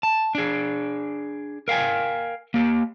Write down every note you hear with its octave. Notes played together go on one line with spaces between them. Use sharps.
A5
D4 G#4
A#4 F5 G5 G#5
A#3 G4